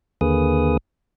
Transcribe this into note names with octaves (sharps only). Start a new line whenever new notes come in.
D#2 D3 A#3 G#4 B4 D#6